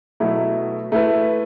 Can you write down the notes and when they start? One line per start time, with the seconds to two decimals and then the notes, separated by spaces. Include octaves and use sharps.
0.20 B2 F#3 A3 E4
0.92 A3 E4 B4